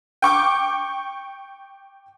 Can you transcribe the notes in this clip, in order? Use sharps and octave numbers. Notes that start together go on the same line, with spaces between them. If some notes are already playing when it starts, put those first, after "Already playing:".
G5 C#6 D6